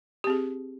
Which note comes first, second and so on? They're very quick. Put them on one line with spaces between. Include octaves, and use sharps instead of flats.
G4 C4 G#4